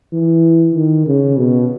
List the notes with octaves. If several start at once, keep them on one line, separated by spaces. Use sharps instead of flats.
E3
D#3
C#3
B2